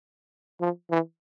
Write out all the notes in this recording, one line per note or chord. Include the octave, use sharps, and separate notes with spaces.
F3
E3